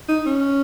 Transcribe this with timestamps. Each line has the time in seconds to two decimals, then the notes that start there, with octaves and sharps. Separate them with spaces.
0.08 D#4
0.26 C#4